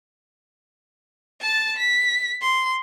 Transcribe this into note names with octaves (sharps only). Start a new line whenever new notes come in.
A5 A6
B6
C6